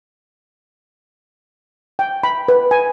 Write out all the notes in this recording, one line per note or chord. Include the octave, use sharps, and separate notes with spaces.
G5
B5
B4
G#5